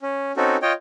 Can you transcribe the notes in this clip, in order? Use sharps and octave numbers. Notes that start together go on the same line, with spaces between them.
C#4
C4 C#4 D#4 F#4 A4
F4 C#5 D#5 G5